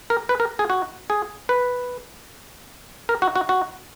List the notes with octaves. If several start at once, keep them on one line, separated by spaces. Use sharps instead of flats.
A#4
B4
A#4
G#4
F#4
G#4
B4
A#4
F#4
F#4
F#4